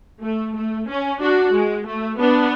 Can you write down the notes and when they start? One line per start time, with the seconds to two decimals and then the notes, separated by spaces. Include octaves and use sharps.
0.23 A3
0.56 A3
0.89 C#4
1.22 D4 F#4
1.54 G#3
1.87 A3
2.19 B3 D4